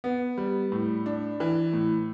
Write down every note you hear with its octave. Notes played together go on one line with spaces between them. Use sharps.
B3
G3
A2
D4
E3
A2